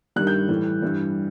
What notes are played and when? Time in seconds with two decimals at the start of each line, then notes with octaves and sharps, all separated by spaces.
0.16 G2 D#3 G3 F#6
0.27 G6
0.49 A2 E3 G3
0.82 G2 E3 G3